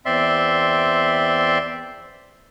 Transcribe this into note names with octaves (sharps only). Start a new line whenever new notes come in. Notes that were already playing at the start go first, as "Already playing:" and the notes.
E2 C4 D5 E5 C6